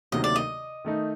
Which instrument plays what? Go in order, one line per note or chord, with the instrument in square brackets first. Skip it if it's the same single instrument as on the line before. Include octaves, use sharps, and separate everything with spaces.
[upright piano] D2 C3 D#3 F#3 A#3 [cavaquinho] D#5
[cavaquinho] D5
D#5
[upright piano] D#3 A3 D#4